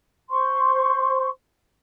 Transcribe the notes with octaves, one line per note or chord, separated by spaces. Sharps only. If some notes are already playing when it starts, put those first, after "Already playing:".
C5 C6 C#6